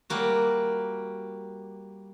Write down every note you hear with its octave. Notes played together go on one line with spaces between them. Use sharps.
G3 A#3 F#4